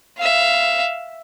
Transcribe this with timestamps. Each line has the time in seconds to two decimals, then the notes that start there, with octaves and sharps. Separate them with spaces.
0.18 E5 F5